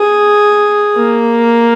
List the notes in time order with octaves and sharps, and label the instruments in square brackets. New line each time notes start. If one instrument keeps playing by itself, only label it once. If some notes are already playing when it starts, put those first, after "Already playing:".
Already playing: [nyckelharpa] G#4
A#3